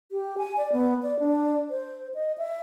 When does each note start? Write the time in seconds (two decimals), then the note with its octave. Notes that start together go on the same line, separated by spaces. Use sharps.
0.12 G4
0.38 G#5
0.57 D5
0.72 B3
1.03 D5
1.20 D4
1.70 C5
2.14 D#5
2.38 E5